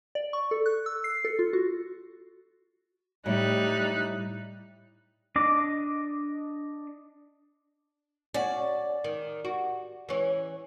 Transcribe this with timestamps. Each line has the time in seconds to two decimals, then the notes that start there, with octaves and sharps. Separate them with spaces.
0.15 D5
0.33 C#6
0.51 A4
0.66 F#6
0.86 E6
1.04 C7
1.25 A4
1.39 F4
1.53 F#4
3.26 A2 G3 D#4 F#6
5.36 D4 D#5 D6
8.34 C#4 F#4 D5
9.04 D#3
9.45 F#4
10.09 E3 C#4